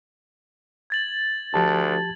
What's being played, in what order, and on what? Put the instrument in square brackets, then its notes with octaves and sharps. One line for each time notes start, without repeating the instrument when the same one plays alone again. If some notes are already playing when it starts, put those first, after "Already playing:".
[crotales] G#6 A6 F#7
[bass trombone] D2 [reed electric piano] F3 G4 A5